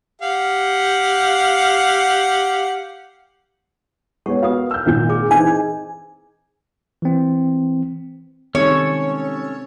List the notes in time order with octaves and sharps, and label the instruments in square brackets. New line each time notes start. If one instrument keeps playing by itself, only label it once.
[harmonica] G4 F5 F#5
[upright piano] G#3 B3 C#5 [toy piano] F#5 C#6
[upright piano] B3 F#4 F5 [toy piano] F4 A#4 D#6
[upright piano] E6 F6 G6
[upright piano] G#1 A#2 G6 [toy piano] F5
[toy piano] G#4 D6
[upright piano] E3 C4 D#4 [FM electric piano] G#5
[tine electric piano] E3 C4
[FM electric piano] D#3 G3 G#3 [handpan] C4 [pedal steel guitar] C#4 A4 [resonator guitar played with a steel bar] C#5